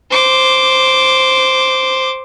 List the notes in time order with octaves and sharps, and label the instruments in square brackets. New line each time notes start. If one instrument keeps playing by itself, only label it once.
[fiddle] C5 D6